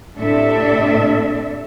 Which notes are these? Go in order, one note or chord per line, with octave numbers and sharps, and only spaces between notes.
A2 C3 D4 A4 D5 E5